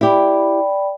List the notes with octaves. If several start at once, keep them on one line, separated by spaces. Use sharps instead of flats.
E4 G4 D5 G5 B5